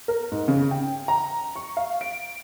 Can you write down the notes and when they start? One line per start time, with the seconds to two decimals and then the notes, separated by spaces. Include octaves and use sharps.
0.08 A#4
0.32 G#2
0.48 C#3
0.71 G5
1.08 A#5
1.56 C#6
1.77 F5
2.01 D7